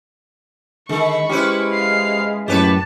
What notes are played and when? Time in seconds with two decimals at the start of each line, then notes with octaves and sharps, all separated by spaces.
0.89 D3 D#3 G#3 B5 C#6
1.29 G#3 C#4 E4 G4 B4 C5
1.71 F5 C7
2.48 F#2 A2 G4 B4 C#5 A5